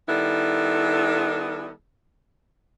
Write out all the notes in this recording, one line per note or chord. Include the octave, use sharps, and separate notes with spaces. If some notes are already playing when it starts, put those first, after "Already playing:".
D#3 G3 B3 E4 A4